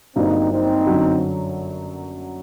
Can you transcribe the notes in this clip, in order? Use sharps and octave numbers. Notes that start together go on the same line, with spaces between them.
G1 G2 F#3 A#3 C4 D#4
C4 D#4
F#2 D3 F#3